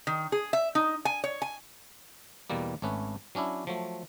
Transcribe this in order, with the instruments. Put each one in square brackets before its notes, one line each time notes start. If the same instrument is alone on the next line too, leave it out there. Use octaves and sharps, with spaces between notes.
[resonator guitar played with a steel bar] D#3
G#4
E5
D#4
G#5
C#5
G#5
[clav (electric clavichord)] E2 B2 G3 A#3
G#1 A3 C#4 B4
F#3 C#4 D4 E4
F3 F#3 A3